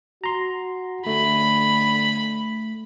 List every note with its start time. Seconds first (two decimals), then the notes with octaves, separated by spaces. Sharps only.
0.24 F#4 A#5 C6
1.07 D3 A3 B5